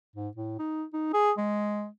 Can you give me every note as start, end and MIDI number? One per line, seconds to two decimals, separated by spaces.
0.15 0.28 44
0.37 0.56 45
0.59 0.84 63
0.93 1.12 63
1.13 1.31 68
1.37 1.88 56